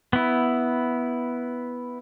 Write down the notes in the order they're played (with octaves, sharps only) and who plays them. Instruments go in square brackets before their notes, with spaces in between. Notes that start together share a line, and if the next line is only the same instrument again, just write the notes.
[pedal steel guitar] B3 E4